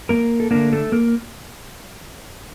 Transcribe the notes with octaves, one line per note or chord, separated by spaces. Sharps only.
A#3 A#4
A4
D3 A3 A#3 D4 A#4
A3 A4
A#3 A#4